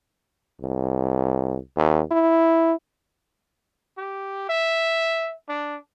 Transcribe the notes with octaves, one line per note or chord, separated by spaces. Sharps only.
C2
D#2
E4
G4
E5
D4